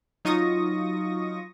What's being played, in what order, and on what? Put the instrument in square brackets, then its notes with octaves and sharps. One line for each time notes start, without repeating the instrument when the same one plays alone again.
[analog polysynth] F#3 D#4 F4 C#6 D#6 A#6